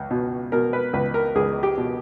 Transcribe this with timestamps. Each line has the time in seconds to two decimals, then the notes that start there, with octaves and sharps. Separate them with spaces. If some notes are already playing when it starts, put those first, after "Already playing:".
Already playing: C#2
0.11 B2
0.52 B2 A#4
0.73 B4
0.93 C#2 B4
1.14 A#4
1.35 C#2 G#4
1.63 G4
1.77 B2